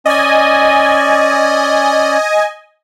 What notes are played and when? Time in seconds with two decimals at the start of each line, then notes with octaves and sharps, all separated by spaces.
0.06 C#4 D5 D#5 G#5